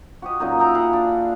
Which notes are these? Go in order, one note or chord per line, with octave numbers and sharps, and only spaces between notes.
F#4 G4 D#5
F#2 A#2 D#4
D#5 E5 G5 A#5
E4 G#4 F5 F#5
D4